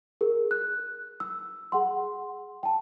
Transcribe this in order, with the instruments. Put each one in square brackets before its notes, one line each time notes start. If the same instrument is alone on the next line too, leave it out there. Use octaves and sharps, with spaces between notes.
[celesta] G#4 A#4
F#6
E6
G#4 F#5 C6
G5 A5